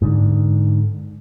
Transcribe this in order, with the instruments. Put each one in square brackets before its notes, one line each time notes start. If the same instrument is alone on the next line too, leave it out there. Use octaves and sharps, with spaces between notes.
[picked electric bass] G#2 D3